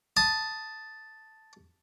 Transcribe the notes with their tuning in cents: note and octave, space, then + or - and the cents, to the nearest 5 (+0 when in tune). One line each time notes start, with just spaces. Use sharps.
A5 +0 D#6 +0